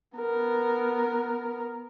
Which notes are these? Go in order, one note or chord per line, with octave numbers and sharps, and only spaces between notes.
B3 A#4